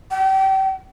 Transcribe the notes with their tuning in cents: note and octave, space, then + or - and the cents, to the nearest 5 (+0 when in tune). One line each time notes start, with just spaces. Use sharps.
G5 -35